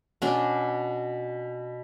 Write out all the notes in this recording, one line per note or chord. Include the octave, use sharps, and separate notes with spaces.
B2 C#4 D4